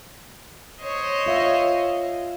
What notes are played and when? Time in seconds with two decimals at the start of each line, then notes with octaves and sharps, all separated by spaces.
0.81 C5 C#5 D#5
1.26 F4 E5 F5